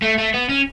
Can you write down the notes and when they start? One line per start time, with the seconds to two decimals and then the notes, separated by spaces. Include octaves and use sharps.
0.02 A3
0.18 A3
0.34 B3
0.49 C#4